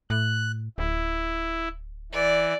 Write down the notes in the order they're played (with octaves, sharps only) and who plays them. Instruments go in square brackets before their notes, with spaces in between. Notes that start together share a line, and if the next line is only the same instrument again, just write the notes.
[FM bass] A2 [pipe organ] F#6
[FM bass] D1 [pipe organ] E4
[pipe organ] E3 [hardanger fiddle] D5